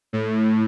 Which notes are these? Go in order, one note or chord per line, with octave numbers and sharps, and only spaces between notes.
A2